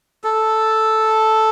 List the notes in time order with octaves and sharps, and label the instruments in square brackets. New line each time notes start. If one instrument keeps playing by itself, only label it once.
[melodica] A4